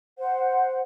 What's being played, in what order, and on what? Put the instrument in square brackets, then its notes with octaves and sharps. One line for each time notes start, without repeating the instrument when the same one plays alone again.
[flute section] C5 F#5